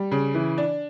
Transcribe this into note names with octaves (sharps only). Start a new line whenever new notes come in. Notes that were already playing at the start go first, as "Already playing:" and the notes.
Already playing: G3
C#3
E3
D4